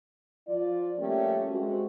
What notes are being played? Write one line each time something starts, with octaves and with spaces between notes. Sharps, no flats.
F3 F4 D5
G3 A3 A#3 C#4 G4
G#3 C4 F#4